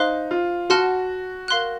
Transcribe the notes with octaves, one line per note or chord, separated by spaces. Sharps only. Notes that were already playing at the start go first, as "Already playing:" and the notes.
Already playing: D#4 C5 F5 C6 F#6
F4
F#4 F#5 A5 C6 F6
A#4 F5 C6 F#6